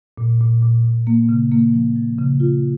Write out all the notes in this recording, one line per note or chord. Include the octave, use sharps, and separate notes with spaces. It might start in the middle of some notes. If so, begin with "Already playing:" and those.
A#2
A#2
A#2
A#2
A#3
C#3
A#3
F3
F3
C#3
F4